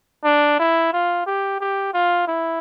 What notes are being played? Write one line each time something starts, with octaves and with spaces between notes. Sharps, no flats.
D4
E4
F4
G4
G4
F4
E4